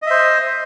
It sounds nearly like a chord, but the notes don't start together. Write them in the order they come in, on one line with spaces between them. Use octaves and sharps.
D#5 E5 C5